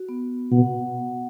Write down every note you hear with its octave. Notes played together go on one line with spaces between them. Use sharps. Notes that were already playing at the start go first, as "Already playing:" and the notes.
Already playing: F#4
B3
B2 F#5